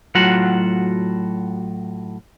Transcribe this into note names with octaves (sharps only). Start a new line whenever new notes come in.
A2 F#3 F4 F#4 F#5